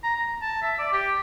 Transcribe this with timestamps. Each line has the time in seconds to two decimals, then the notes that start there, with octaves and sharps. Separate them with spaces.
0.03 A#5
0.17 A#5
0.42 A5
0.62 E5
0.78 D5
0.93 G4